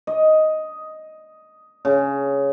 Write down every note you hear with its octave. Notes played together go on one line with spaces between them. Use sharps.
D#5
C#3